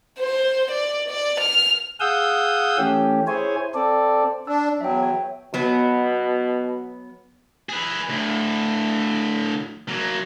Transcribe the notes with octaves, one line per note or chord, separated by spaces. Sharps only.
C5
D5
D5
F6
G#4 F5 F#5 D#6 E6 G6
E3 A3 C#4 G4
E4 G#4 C5 C#5 G#5
C4 A4 D5
D4 A5 E6
E2 F#3 E5 G5
C#5
B2 F#3 B3
G#4 B4
D2 A2
F#3 A#3